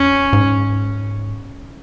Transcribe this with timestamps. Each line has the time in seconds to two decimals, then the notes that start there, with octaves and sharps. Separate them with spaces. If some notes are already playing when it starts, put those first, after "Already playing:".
Already playing: F2 C#4
0.33 G#2